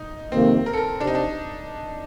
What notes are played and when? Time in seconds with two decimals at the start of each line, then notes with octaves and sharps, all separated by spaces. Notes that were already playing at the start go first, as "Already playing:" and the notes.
Already playing: D#4
0.32 F2 C3 D#3 A#3 C4
0.66 A#4
0.73 A4
0.77 A#4
1.00 C3 D4
1.07 D#4
1.15 D4